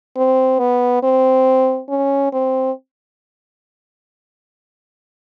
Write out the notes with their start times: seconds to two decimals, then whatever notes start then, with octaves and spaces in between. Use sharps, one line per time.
0.17 C4
0.59 B3
1.03 C4
1.89 C#4
2.32 C4